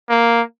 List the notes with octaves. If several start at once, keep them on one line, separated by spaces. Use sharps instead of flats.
A#3